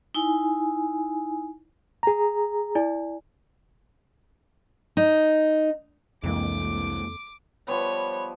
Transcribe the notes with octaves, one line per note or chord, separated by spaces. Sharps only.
D#4 E4 G#5
G#4 A#5
E4 D5 G#5
D#4
C2 F2 E3 G#3 A#3 D6
F3 G3 B3 C#5